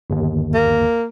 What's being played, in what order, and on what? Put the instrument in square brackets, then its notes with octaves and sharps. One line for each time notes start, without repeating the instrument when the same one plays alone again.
[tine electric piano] G1 D#2
[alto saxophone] A#3